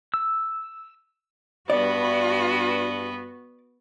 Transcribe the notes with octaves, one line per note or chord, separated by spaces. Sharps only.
E6
G2 B3 F#4 D5